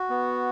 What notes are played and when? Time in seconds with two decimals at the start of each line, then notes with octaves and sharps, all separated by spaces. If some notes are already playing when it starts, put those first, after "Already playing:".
Already playing: F#4
0.10 B3